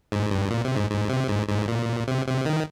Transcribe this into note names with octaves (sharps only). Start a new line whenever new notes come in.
G#2
G2
A#2
C3
G#2
G#2
C3
G#2
G#2
A#2
C3
C3
D#3